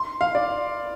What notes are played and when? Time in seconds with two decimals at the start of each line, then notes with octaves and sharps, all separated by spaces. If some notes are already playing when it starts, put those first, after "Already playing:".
Already playing: C6
0.21 F5
0.35 D5